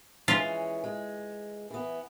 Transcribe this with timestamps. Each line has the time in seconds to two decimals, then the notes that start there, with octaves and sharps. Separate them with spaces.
0.28 E3 G#3 C#4 F4
0.84 G#3
1.70 E3 B3